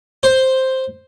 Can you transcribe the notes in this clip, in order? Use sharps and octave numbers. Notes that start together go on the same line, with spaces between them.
C5